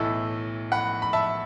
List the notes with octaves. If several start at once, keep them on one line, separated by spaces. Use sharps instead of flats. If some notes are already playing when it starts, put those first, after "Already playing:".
Already playing: B1 A2 E3 E4 A4
F#5 B5
B5
E5 A5